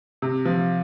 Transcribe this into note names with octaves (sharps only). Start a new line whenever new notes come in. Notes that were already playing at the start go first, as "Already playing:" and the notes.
C3
F3